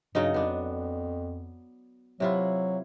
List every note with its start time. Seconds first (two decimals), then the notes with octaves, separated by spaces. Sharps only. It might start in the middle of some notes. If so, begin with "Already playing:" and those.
0.15 G2 C#3 F#3 D#4
0.34 F2 B3 D4
2.20 C3 F#3 E4 F4